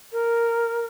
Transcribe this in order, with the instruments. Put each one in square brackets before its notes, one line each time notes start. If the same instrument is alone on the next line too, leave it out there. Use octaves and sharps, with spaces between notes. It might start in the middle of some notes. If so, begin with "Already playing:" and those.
[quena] A#4